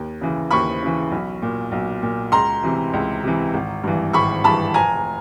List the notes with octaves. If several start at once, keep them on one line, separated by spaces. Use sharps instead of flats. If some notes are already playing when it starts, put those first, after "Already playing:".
Already playing: D#2
C#3 E3
D#2 B5 C#6
C#3 E3
B1
A#2
B1
A#2
C#2 A#5 C6
C3 E3
C#2
C3 E3
G#1
G2 E3
G#1 B5 C#6
G2 E3 A5 B5
F1 G#5 A#5